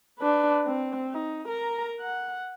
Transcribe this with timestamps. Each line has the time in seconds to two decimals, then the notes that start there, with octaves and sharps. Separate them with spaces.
0.19 D4 B4
0.65 C4
1.11 D#4
1.47 A#4 A#5
2.00 F#5